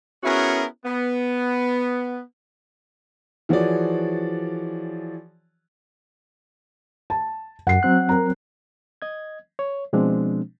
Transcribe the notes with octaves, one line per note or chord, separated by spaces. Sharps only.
B3 C#4 E4 F#4 G#4 A#4
B3
E3 F3 F#4 G#4 C#5 D5
A5
F#2 F#5 C7
F#3 C4 F#6
A#4 A#5
D#5 G#6
C#5
B2 F3 G#3 C4 D4